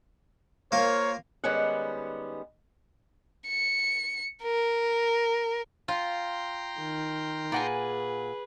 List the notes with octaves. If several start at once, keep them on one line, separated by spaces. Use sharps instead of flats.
A#3 F4 A#4 C5 C#5
D#3 G3 G#3 B3 C#4 F#5
C#7
A#4
F4 G5 A#5 C6
D#3
A#2 G#4 B4 F#5 G#5